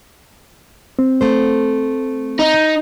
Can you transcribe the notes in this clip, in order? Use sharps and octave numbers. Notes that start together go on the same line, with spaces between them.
C4
A3 C5
D#4